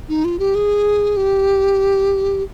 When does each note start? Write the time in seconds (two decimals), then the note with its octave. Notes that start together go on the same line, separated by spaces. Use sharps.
0.09 D#4
0.25 F4
0.39 G4
0.55 G#4
1.17 G4